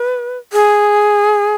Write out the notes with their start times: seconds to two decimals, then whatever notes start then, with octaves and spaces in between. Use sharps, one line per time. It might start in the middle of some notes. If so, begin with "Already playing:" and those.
Already playing: B4
0.53 G#4